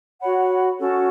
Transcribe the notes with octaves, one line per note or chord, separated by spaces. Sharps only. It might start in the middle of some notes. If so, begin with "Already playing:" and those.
F#4 C#5 F#5 B5
C#4 F#4 A4